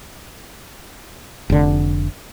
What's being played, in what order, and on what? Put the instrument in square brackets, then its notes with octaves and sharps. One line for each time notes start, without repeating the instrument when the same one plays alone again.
[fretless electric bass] F1 D3